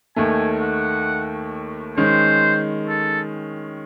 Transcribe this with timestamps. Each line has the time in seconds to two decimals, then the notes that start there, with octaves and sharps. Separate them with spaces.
0.16 D#2 D#3 A3 G#5
0.62 F#5
1.97 D#3 G#3 C#4 C5
2.89 A4